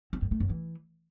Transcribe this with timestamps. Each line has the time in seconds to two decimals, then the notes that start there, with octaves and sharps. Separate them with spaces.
0.13 C4
0.22 G2
0.31 A3
0.40 F#2
0.50 E3